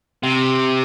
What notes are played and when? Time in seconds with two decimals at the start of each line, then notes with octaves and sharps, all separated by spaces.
0.23 C3